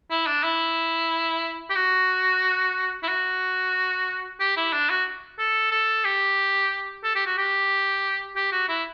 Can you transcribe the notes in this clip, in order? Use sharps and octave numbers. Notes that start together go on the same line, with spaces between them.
E4
D4
E4
G4
F#4
E4
F#4
G4
E4
D4
F#4
A4
A4
G4
A4
G4
F#4
G4
G4
F#4
E4